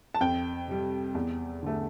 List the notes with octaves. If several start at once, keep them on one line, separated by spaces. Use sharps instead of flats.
A5
F2 G5
C3 G3
E2
D3 A3